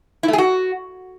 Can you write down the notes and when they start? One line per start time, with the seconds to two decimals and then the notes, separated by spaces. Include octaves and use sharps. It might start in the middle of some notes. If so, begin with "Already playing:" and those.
0.23 E4
0.28 A3
0.33 G#4
0.38 F#4